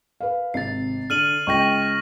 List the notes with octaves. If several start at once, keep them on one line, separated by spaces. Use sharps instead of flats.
B4 F5
G#1 C3 A6 C7
D3 F6 D#7 F#7
C#2 G5 C#6 A#6